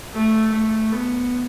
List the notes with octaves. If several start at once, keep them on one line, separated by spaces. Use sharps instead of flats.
A3
A3
B3